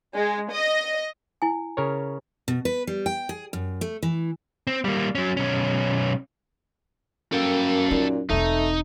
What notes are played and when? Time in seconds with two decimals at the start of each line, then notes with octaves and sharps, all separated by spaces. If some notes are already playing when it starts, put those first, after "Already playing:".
0.15 G#3
0.52 D#5
1.42 E4 G#5
1.77 C#3 A#4 C#5
2.48 B2
2.65 B4
2.87 G3
3.06 G5
3.29 G#4
3.53 F#2
3.81 A3
4.03 E3
4.67 C4
4.85 G3 A#3
5.15 F#3 C#4
5.37 B1 C#4
7.33 F#2 A#3 A4 G5
7.91 A#2 D#4
8.30 E1 A3 C4 D#4